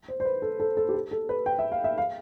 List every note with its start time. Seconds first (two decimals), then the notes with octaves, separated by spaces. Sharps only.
0.08 C5
0.20 C5
0.25 B4
0.42 A4
0.60 A4
0.77 A4
0.89 G4
0.94 A4
1.11 A4
1.29 B4
1.46 G5
1.59 E5
1.72 F5
1.84 E5
1.98 F5